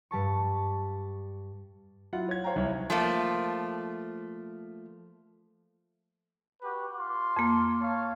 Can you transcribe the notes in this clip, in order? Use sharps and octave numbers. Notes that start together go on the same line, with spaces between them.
G2 G3 A5 C#6
F#3 E4 F4 F#5
C#5 G#6
C5 C#5 F5 G5 A#5
C2 C#5
F3 A3 A#3
F#4 G4 B4
F4 C6 D6
F2 A#3
C#5 F5 A5